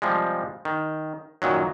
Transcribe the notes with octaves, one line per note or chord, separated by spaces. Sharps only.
C3 F3 G3 G#3
D#3
F#2 A#2 D#3 F#3